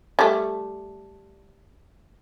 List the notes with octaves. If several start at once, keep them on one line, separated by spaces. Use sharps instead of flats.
G3 A3